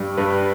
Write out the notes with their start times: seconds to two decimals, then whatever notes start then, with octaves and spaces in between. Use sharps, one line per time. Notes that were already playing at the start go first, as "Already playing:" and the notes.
Already playing: G2 G3
0.17 G2 G3 B4